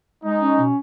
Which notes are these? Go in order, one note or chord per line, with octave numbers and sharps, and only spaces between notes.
G#3 D#4
C#4
B2